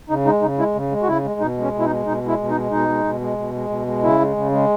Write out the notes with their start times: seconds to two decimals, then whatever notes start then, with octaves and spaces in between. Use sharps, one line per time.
0.10 C#3 D#4
0.26 G#3 D#4
0.42 C#3 D#4
0.59 G#3 E4
0.75 C#3
0.91 G#3
1.03 F#4
1.07 C#3 E4
1.24 G#3
1.40 B2 D#4
1.57 G#3 C#4
1.74 B2
1.80 E4
1.85 D#4
1.90 G#3
2.06 B2 D#4
2.23 G#3 E4
2.39 B2
2.50 D#4
2.55 G#3
2.71 B2 D#4
2.89 G#3
3.05 B2
3.20 G#3
3.38 B2
3.54 G#3
3.70 B2
3.87 G#3
4.03 C#3 E4
4.20 G#3
4.36 C#3
4.52 G#3